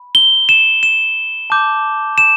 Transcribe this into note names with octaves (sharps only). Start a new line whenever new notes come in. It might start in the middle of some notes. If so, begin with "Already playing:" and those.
Already playing: B5
G7
E7
E7
A5 D6 G6
E7